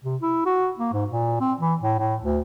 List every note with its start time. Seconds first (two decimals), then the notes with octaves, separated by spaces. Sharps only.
0.04 C3
0.22 E4
0.46 F#4
0.78 A#3
0.93 G#2
1.10 A#2
1.40 C4
1.60 E3
1.82 A2
1.98 A2
2.23 D2